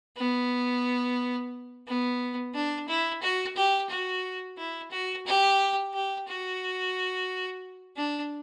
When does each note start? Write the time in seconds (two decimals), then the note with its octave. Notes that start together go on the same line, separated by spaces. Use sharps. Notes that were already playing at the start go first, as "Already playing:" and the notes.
0.17 B3
1.88 B3
2.54 D4
2.88 E4
3.22 F#4
3.56 G4
3.90 F#4
4.57 E4
4.91 F#4
5.26 G4
5.94 G4
6.28 F#4
7.96 D4